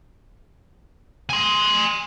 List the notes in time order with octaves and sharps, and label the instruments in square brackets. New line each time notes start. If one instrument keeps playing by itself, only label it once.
[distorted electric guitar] G#5 C6